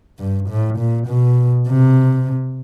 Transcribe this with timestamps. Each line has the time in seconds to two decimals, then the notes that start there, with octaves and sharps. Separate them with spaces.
0.19 G2
0.49 A2
0.78 A#2
1.07 B2
1.67 C3